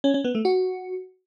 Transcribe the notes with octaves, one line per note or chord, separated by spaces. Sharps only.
C#4
C#4
B3
A3
F#4